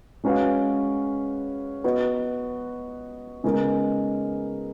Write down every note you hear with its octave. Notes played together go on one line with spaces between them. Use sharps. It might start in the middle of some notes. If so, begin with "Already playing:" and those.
G#3 C#4 F#4 B4 F5
B3 F#4 B4 D#5
C#3 G#3 B3 D#4 A#4